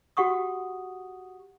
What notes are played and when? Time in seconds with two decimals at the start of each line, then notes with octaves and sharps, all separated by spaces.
0.17 F#4 G4 F#5 C#6 D#6